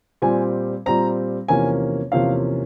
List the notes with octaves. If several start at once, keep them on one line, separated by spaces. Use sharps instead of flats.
A#2 G3 C4 G#5
A#2 G3 C4 A#5
E2 C3 F3 A#3 C#4 G#5
E2 C3 F3 A#3 C#4 F5